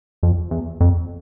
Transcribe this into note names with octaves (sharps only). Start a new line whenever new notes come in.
F2
E2
F2